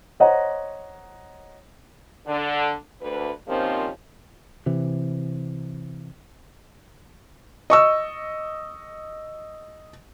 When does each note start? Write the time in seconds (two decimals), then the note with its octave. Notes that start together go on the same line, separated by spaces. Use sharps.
0.20 C5 C#5 D#5 F#5 A#5
2.27 D3
3.01 D2 B4
3.48 A#2 D#3 F3 C4 C#4 G4
4.66 C3 E3
7.70 D#5 C#6 E6